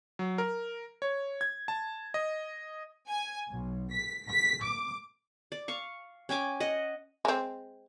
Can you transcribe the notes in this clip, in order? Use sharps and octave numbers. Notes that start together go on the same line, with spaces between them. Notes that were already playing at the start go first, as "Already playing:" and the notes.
F#3
A#4
C#5
G#6
A5
D#5
G#5
B1
B6
B6
D6
D5
F5 C#6
C#4 G5 G#5 D6
D#5 F#5
G#3 C4